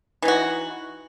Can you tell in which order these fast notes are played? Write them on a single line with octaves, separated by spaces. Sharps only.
E3 D#4 F#4